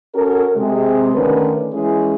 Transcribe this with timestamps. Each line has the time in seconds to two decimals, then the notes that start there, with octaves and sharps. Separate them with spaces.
0.14 C#4 F#4 A4 A#4
0.56 C3 G#3
1.15 D3 D#3 A3 C#4 A#4 B4
1.73 E3 G#3 C#4 E4 G#4